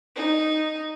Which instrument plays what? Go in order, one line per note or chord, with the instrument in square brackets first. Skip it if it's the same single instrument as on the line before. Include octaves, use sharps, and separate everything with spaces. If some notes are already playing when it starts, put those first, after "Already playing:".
[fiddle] D#4